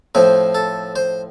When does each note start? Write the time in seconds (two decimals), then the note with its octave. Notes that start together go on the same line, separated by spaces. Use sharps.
0.15 A2 F3 C4 C5
0.55 A4
0.96 C5